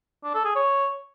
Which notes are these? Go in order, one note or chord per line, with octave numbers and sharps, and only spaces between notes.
D4
A4
G#4
C#5